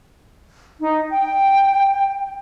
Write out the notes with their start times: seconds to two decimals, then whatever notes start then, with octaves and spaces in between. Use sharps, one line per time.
0.81 D#4
1.11 G5